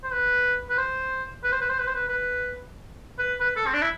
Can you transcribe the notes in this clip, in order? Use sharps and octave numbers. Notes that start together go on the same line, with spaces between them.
C5
B4
B4
C5
B4
C5
B4
C5
B4
C5
B4
B4
B4
B4
A4
C4
D4
E4